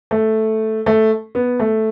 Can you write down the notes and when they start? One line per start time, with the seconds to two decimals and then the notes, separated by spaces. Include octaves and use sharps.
0.11 A3
0.86 A3
1.35 B3
1.60 A3